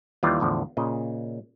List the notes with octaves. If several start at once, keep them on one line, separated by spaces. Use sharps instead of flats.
D#2 E3 G3 F4 D5 A#5
E2 A2 D3 F3
A#2 C#3 D#5